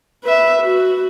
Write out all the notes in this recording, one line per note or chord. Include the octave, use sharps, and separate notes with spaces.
B4 E5
F#4